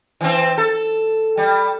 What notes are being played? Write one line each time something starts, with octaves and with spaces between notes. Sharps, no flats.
E3 C4
A4
G3